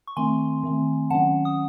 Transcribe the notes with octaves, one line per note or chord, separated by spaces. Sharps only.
C#6
D#3 A3 C4 G#5 C6
D#3 A3 C4
D#3 F#3 C#4 F#5 A5
D#6